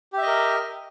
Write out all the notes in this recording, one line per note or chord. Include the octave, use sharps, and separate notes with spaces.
G4 A#4 D#5 E5